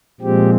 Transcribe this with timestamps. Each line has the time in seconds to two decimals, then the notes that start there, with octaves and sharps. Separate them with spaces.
0.20 A#2 F3 G#3 C4 G4